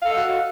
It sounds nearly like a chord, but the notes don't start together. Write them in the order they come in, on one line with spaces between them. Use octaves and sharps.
F5 A4 D#5 F#4